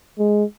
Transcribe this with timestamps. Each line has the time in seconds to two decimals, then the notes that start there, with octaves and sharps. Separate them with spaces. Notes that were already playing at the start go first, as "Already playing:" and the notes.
0.19 G#3